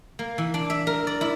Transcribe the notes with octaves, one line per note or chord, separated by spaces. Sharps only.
A#3
E3
D4
E5
A#4
D5
E4